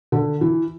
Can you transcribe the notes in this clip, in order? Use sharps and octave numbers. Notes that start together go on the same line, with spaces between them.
D3
E3